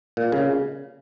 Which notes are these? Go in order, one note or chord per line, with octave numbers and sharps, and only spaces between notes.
A#2
C#3